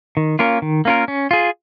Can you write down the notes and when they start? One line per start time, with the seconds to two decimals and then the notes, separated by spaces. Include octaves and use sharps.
0.17 D#3
0.39 A#3 C#4 F4 A#4
0.62 D#3
0.85 A#3 C#4 F4 A#4
1.08 C#4
1.31 F4 G#4